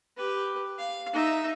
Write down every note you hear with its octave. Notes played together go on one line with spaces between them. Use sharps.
G4 B4
F5
D#4 E5